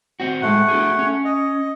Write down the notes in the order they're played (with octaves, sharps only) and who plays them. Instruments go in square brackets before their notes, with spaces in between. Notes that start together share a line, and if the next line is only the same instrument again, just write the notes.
[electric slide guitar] C4 F#4
[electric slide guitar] A2 G#3 [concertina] A3 F#5
[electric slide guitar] D4 F#4 G#4
C#4
[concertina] D#5